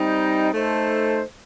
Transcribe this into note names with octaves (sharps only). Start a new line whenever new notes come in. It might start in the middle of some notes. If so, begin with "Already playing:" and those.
Already playing: G3 C4 D#4
A3 D#4 A4 C5